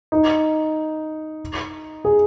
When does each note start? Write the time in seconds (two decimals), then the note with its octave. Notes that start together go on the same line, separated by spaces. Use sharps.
0.12 D#4
2.05 G#4